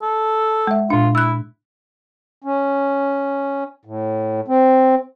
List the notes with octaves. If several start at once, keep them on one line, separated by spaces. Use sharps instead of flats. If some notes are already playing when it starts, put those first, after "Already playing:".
A4
G#3 E5
A#2 D4 F4
E4 E6 F#6
C#4
A2
C4